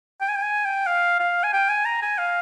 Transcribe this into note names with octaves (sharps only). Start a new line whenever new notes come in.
G5
G#5
G5
G#5
G5
F5
F5
G#5
G5
G#5
A#5
G#5
F5